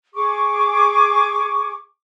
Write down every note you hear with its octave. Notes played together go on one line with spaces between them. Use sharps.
G#4 C#6 D6